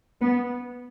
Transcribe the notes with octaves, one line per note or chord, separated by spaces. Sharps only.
B3